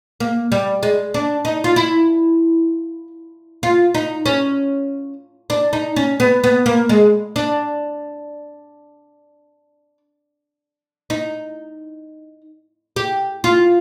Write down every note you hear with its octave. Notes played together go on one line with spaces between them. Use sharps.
A#3
G3
G#3
D4
D#4
F4
E4
F4
D#4
C#4
D4
D#4
C#4
B3
B3
A#3
G#3
D4
D#4
G4
F4